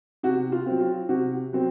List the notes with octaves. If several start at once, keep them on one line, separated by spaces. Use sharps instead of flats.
C3 F#4
F4
F#3 C4
F4
C3 F#4
F#3 C4